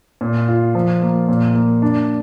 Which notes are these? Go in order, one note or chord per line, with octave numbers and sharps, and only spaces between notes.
A#2
F4
F3
A#3
A#2
A#3
D4